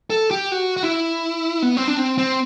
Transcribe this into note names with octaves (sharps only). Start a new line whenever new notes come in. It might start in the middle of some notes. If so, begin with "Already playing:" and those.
A4
G4
F#4
F#4
E4
B3
C4
D4
C4
C4